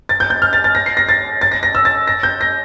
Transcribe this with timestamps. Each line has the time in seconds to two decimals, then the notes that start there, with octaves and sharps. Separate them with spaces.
0.09 A6
0.20 G6
0.30 G6
0.42 F6
0.53 A6
0.64 A6
0.75 A#6
0.86 C7
0.97 A#6
1.09 A6
1.41 A6
1.52 A#6
1.63 A#6
1.75 E6
1.85 A6
2.07 A#6
2.23 G6
2.41 A#6